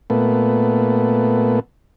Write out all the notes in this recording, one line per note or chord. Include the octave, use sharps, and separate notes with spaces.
A#2 A3 B3